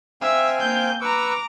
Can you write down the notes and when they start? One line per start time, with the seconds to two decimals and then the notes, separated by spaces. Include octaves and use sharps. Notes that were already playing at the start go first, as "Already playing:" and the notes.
0.22 C4 E5 F5 G#5
0.61 A#3 G6
1.02 B4 A#5 C#6 D6 E6